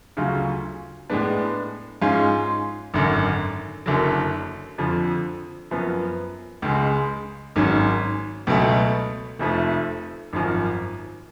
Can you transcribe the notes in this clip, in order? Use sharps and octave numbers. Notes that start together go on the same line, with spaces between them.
D2 C#3 F#3 C#4 F4
A2 G#3 B3 D4
G#2 G#3 C#4 F4
G#1 F#2 D3
F#1 F#2 D3 F#3
F2 D3 F3
F#2 F3 B3
C#2 C#3 G#3
G#1 G#2 F#3 C#4
C#2 B2 F#3 A3
F1 F2 F3 A3
G#1 F#2 F3